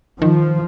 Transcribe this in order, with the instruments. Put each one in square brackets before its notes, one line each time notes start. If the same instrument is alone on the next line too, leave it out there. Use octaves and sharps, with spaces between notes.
[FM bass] D#3 [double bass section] F3